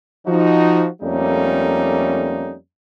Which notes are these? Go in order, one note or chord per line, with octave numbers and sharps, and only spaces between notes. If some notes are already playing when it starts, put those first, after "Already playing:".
F3 D#4 F#4
F2 G3 A3 A#3 C#4 D#4